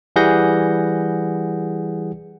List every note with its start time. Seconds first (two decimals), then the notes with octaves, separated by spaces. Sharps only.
0.16 E3 G3 G#4 F#5 G6 A#6